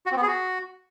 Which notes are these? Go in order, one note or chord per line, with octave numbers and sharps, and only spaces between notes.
F#4
C4
B3
G#4
F#4